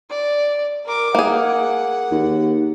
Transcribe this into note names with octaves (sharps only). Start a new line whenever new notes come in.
D5
A#4 D6
A#3 G#4 F#5
D#2